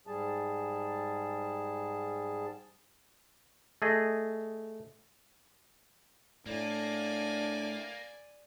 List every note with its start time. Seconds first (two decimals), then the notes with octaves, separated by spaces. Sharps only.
0.07 G#2 G3 G#4 A5
3.82 A3 G#4 D#5
6.46 A2 A#3 D4 D5 G#5